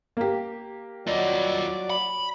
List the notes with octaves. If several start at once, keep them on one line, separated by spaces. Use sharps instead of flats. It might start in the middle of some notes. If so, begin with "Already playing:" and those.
A#3 G4
F#3 F4 D5 D#5
B5